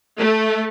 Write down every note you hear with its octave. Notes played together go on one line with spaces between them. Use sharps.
A3